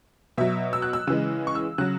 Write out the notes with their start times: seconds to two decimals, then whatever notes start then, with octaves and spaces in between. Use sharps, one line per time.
0.38 B2 F#3 E5
0.73 E6
0.82 F#6
0.93 E6
1.07 C#3 E3 G#3 E6
1.47 C#6
1.55 E6
1.78 C#3 F#3 F#6